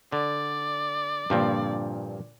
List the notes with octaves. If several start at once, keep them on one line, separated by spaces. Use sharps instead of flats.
D3 D5
G2 A#2 D3 F3 C4